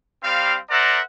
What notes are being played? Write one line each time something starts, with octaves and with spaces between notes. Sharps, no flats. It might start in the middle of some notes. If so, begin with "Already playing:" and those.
G3 C4 F5
A#4 C5 D5 E5 F#5 A#5